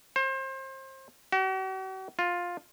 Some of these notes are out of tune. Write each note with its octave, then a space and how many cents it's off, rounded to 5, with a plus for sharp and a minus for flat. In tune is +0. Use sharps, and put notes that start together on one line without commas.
C5 +30
F#4 +45
F4 +10